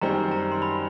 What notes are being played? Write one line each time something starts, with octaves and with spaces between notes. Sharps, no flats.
F#2 D#3 G3 C4 A#5
A#5
C6
B5